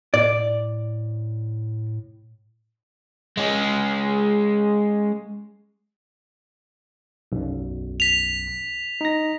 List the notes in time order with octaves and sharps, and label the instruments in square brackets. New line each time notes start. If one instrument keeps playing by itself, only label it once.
[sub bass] A2 [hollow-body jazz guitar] D5
[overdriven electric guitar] G#3 C#4
[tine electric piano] B1 F#2
[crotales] B6 F7
[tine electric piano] D#4 A#6